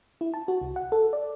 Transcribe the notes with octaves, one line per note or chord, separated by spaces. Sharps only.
E4
A5
F#4
C2
F#5
A4
D5